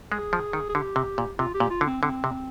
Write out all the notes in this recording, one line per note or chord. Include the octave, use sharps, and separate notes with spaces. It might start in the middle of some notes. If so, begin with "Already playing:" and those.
G#3 G#4
F3
D#3
G#4
D3 G4
C3
A#2
C3 F4
G4
A#2
F4
D3
C4
D3 C4
C3